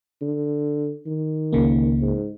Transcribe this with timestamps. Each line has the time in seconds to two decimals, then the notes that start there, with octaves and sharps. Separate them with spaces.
0.21 D3
1.06 D#3
1.53 C#2 C#3 A#3
2.02 G#2